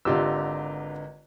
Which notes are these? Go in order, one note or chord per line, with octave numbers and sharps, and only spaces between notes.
G#1 D3 F4 G4 B4 D#5 A#5 E6